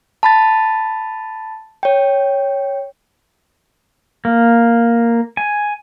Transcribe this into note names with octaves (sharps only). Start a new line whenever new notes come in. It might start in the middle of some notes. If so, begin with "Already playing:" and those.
A5 B5 A6
C#5 G5
A#3
G#5